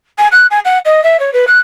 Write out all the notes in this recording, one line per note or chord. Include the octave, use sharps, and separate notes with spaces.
G#5
F#6
G#5
F#5
D#5
E5
C#5
B4
F#6